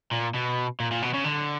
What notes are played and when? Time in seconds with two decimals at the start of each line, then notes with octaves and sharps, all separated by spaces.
0.12 A#2
0.35 B2
0.80 A#2
0.91 A#2
1.02 B2
1.14 C#3
1.25 D3